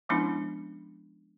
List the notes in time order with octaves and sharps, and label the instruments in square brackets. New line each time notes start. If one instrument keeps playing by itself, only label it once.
[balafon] F3 G#3 B3 C#4 D4 E4